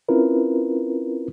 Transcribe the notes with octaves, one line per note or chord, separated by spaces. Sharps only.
C4 C#4 E4 F4 A#4 B4